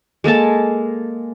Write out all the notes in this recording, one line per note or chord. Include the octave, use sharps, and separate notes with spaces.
G#3 A#3 A4 A5